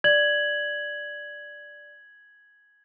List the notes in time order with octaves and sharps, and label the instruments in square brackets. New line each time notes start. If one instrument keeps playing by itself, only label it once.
[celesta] D5 [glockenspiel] G#6 F#7